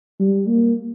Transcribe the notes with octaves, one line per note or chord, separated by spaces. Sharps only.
G3
A#3